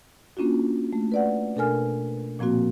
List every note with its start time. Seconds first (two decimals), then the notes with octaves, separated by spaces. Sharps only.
0.37 A#3 C#4 D4 F4 F#4
0.93 A3
1.12 B4 D5 F#5
1.56 B2 D4 A4 A#4 G#5 F6
2.39 A#2 F3 A#3 C4 F#4